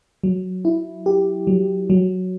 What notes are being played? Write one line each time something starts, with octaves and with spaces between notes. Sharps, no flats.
F#3
E4
G4
F#3
F#3